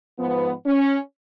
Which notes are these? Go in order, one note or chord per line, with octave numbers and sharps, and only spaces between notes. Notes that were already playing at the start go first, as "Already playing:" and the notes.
G#2 F3 B3
C#4